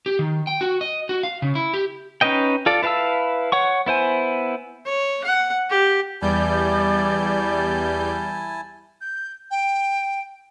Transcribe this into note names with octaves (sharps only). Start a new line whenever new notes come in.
G4
D#3
G5
F#4
D#5
F#4
F5
C#3
E4
G4
C#4 D#4 B4 D#5 G5
F4 A4 D5
E4 B4 F5 A5 E6
C#5 F#5 C#6
B3 E4 C5 G#5
C#5
F#5
G4
E2 G3 E4 D5 G#5 A5 G6
G6
G5